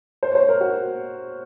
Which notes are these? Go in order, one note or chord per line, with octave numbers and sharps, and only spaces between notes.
C5
C#5
C5
A#4
F#4